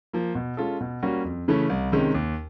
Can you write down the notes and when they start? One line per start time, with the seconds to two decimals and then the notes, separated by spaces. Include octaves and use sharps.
0.13 F3 A#3
0.35 B2
0.57 G#3 C#4 F4 A4
0.81 B2
1.03 G3 A#3 C#4 F#4
1.24 F2
1.48 C#3 E3 A3 C#4
1.69 C2
1.92 C3 D#3 G#3 C#4
2.14 D#2